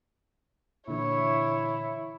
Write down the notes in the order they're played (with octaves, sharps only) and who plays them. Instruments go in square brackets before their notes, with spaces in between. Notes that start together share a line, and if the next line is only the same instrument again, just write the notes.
[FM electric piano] A#2 D3 E3 [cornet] E4 [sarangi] C#5